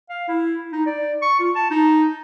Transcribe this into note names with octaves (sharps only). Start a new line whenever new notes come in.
F5
E4
D#4
D5
C#6
F4
A5
D#4